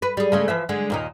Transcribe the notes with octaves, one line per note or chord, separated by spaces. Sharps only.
B4
G3 G#4
C#3 G#3 A3
E3 F3 E5
D3 G#3
D#2 A#2 D#4